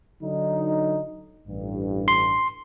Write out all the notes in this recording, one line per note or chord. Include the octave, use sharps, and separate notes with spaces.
D3 F#3 D#4
A1 G2
C6